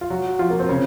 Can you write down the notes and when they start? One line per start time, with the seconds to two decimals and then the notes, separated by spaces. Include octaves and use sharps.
0.01 F4
0.10 F#3 F#4
0.39 F3 F4
0.50 A#3
0.60 C4
0.69 C#3 C#4